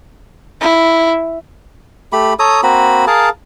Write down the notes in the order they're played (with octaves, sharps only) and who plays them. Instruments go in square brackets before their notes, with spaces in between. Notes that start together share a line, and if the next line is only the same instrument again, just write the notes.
[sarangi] E4
[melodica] A3 G4 B5
A4 C#5 A#5 D#6
A#3 C4 F#4 B5
G#4 A#4 F5 A5